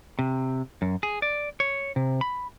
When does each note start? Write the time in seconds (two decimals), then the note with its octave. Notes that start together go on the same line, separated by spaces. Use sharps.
0.19 C3
0.82 F#2
1.03 G#4
1.22 D5
1.60 C#5
1.96 C3
2.21 B5